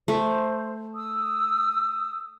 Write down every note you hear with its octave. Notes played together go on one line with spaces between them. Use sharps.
A3 C5
D#6 E6